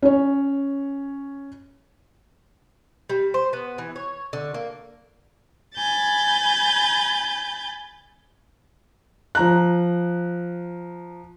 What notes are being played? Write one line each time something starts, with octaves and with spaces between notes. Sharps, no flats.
C#4 C#5
G3
C5
B3
E3
C#5
D3
A#3
G#5 B5 G6 A6
F3 A#5 F#6